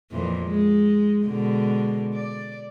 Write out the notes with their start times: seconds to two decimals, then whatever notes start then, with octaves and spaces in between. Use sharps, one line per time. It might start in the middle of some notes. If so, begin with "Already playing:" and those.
0.11 F2 A#2 E3
0.45 G#3
1.25 B2 D3 G#3
2.14 D5